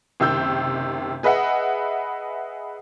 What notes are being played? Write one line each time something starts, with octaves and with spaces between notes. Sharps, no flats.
F#1 C3 D#3 E6 G6
G#4 B4 D#5 E5 F#5